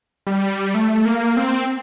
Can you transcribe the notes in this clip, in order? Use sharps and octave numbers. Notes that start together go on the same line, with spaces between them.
G3
A3
A#3
C4